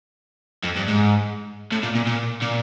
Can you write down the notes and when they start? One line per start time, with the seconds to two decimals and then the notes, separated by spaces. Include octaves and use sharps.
0.64 F2
0.77 G2
0.88 G#2
1.72 A2
1.83 A#2
1.95 A#2
2.07 A#2
2.42 A#2